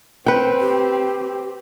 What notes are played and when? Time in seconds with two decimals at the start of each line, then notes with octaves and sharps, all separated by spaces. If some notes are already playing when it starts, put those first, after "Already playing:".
0.26 C4 B4 G5
0.60 G4